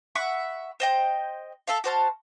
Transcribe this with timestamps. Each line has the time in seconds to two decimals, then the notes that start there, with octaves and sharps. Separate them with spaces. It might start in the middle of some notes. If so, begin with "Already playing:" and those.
0.15 E5 F#5 B5 C#6
0.80 C5 D#5 G5
1.67 A4 E5 F5
1.84 F#4 C5 A5 F6